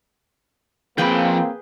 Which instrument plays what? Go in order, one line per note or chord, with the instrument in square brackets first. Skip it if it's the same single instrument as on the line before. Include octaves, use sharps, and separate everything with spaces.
[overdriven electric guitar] F3 B5 [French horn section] A#3 [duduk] C4 [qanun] G#4 B4 G5